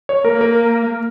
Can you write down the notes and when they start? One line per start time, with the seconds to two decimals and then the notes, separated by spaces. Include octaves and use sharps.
0.09 C#5
0.25 A#3 A#4
0.41 A#4